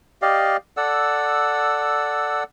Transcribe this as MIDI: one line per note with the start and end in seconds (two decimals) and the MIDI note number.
0.22 0.57 67
0.22 0.57 74
0.22 0.57 75
0.22 0.57 77
0.77 2.43 69
0.77 2.43 74
0.77 2.43 78
0.77 2.43 88